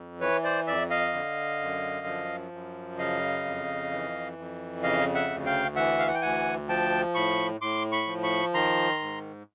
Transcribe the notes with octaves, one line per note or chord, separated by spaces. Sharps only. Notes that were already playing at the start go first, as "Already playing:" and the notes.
Already playing: F2
E3 B4 C#5
C5 D5
F2 D5 E5
D#5 F5
D3
F#2
F3
F#2
C#3 D#5 F5
F2
E3
F2
C#3 D#5 F5
E5 F#5
D2
F5 G5
E3 E5 F#5
F5
F#5
G5
D2 F#5 G#5
F3 G5 A5
A2 B5 C#6
A2 C6 D6
B5 C#6
F3
B5 C#6
D#3 A#5 C6
G#2